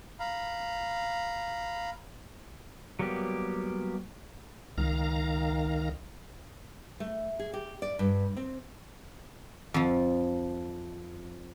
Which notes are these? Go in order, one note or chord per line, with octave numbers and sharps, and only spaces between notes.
F5 A#5 B5
F#3 G3 A#3 B3 G4
C#2 D#3 F5 A#5
A3
G#4
G4
D5
G2
C4
F2 F3